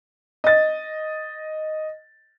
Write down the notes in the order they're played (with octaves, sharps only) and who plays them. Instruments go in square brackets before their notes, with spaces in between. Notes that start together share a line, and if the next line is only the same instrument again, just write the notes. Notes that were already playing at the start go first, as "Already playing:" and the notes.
[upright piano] D#5 A6